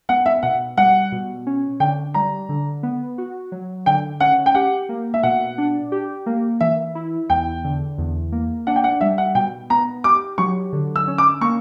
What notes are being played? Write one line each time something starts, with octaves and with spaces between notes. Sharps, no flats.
B3 F#5
E5
B2 F#5
G3 F#5
B2
C#4
D3 G5
G3 A#5
D3
B3
F#4
F#3
D3 G5
C#4 F#5
G5
G4 F#5
A#3
E5
B2 F#5
D4
G4
A#3
E3 E5
E4
E2 G5
D3
E2
A#3
D4 F#5
G5
F#5
G3 E5
F#5
B2 G5
B3 A#5
G4 D6
F#3 C#6
D3
E6
C#4
D6
A#3 C#6